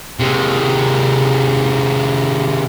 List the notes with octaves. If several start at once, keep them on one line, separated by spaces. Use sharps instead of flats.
C3 G#3